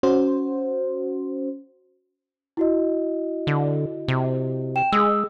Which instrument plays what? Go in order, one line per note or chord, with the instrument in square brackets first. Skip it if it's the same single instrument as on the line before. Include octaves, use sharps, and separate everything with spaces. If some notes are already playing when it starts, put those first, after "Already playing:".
[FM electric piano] C#4 F#4 C5
[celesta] E4 F#4 D#5
[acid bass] D3
C3
[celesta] G5 E7
[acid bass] G#3 [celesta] G#4 D#6 E6